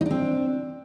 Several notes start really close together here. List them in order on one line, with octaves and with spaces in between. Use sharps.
D#4 D4 C4